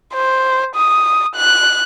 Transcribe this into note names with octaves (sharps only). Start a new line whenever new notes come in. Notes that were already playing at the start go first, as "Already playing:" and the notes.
C5
D#6
F#6